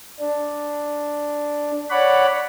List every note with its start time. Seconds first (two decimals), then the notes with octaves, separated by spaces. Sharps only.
0.19 D4
1.90 C#5 D5 F#5 B5